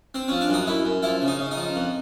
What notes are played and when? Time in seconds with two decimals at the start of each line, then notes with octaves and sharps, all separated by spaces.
0.15 C4
0.28 F3 C#4
0.41 D4
0.49 F#2 D#4
0.67 F#2 E4
0.85 F#2
1.03 F3 E4
1.22 C#3
1.28 D#4
1.39 C#3
1.51 D#4
1.57 F3
1.76 F2